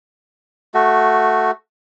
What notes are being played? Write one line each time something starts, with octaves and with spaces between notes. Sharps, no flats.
A3 F#4